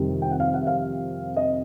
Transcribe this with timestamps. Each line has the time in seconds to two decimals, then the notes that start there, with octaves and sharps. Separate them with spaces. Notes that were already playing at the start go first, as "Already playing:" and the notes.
Already playing: F2 C3 D#3 G3
0.22 G5
0.31 F#5
0.40 F5
0.54 F#5
0.62 E5
0.67 F5
1.37 D#5